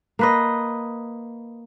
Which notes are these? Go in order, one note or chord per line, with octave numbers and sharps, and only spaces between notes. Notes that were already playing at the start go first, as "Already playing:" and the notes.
A#3 B4 D#5